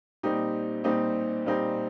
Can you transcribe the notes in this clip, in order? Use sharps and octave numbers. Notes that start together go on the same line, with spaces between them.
A#2 G3 C4 D#4 G4
A#2 G3 C4 D#4 G4
A#2 G3 C4 D#4 G4